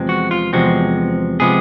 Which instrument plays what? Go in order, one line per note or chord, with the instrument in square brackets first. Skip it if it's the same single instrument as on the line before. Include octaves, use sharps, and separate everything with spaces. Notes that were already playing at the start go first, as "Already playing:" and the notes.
Already playing: [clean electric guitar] E2 C3 F3 G#3 C4
F#4
F4
E2 C3 F3 G#3 C4 F#4
C3 F3 G#3 B3 G#4